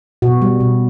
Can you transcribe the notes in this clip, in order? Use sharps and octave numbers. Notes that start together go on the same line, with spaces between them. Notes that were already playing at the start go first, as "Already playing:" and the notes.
B2 F#4
G3
B2